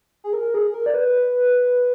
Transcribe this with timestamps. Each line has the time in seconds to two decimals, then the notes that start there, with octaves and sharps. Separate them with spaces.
0.24 G#4
0.33 A#4
0.54 G#4
0.74 A#4
0.86 D5
0.94 B4